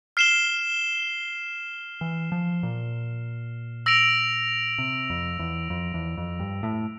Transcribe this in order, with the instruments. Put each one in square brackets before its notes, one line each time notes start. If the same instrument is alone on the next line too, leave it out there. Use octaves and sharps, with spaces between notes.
[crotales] F6 C7 E7 G7
[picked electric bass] E3
F3
A#2
[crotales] E6 A#6 D7 F7
[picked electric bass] C3
F2
E2
F2
E2
F2
G2
A2